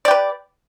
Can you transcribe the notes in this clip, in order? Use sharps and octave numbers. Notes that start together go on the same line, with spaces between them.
G4 B4 D5